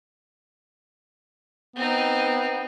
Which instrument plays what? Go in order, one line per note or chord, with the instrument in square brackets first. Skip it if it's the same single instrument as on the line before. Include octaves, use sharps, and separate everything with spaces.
[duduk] B3 [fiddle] C4 D#4